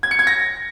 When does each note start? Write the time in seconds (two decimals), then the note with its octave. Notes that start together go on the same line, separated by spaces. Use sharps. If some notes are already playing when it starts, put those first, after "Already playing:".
0.03 G#6
0.11 C#7
0.19 G#6
0.27 A#6